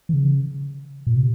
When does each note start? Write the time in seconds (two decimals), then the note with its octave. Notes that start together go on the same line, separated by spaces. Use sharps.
0.09 E3
0.14 C#3
1.07 A#2
1.16 C3